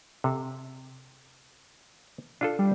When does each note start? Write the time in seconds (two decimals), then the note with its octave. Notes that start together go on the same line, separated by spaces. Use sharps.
0.24 C3 A4
2.41 D4 F4 A4
2.59 G3